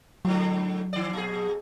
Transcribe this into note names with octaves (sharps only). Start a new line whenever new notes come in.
G#2 D3 F#3
D#3 D5
A#2 G#4